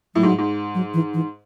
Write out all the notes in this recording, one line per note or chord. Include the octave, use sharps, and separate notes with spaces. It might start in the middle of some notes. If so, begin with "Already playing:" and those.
A2 F#3
G#2
G#2
F#3
E3
E3